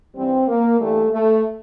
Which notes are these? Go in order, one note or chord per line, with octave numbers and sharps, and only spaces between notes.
G2 E3 G3 C4
A#3
G2 E3 G3 A3
A3